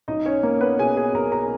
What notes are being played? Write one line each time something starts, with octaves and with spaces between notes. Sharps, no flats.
B1 D#4 D#5
C#4 C#5
A#3 A#4
B3 B4
B2 G#4 G#5
G#4 G#5
B1 A#4 A#5
A#4 A#5